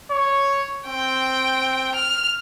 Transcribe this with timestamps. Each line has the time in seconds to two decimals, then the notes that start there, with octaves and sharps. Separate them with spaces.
0.11 C#5
0.87 C4 G5
1.95 F6